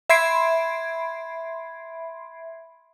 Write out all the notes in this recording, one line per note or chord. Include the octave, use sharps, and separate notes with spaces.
E5 B5 C6 G#6 C7 D7